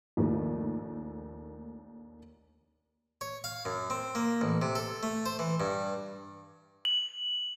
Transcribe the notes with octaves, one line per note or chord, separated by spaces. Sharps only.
A#1 D#2 D#3 A3
C#5
F5
F#2
C4
A#3
A1
C3
A4
A3
C5
E3
G2
F#7